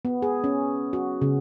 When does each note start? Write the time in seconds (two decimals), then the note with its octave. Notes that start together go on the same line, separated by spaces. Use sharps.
0.05 B3
0.22 G#4
0.44 C#4
0.93 F#4
1.22 C#3